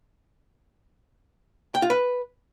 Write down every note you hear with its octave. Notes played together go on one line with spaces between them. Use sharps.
G5
F4
B4